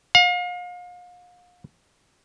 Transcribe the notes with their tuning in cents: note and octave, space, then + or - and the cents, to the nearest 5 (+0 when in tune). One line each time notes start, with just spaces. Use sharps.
F5 +35